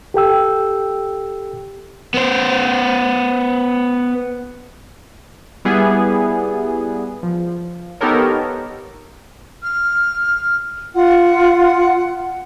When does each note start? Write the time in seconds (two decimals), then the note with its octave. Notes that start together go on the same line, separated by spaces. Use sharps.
0.14 G4 A4 G5 E6
2.14 B3 C5
5.65 G3 B3 E4 G#4
7.23 F3
8.01 B3 D#4 G4 A4 A#4 C#5
9.63 F6
10.95 F4 F#5